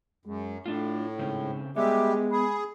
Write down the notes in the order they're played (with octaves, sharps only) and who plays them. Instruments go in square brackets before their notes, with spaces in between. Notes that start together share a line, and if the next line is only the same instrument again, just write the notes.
[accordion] F#2 [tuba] G#3
[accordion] A2 [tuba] A3 [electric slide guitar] D4 F4
[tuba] G#2 [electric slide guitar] C#3 C4 C#4
[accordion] G3 G4 [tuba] G#3 [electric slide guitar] B3 [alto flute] E5
[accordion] G#4 [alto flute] B5